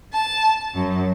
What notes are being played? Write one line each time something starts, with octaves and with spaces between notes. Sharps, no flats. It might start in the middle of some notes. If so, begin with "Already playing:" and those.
A5
F#2